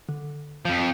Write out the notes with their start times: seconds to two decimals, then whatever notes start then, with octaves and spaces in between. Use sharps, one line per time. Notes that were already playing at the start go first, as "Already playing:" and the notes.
0.09 D3
0.65 F2 F3 G6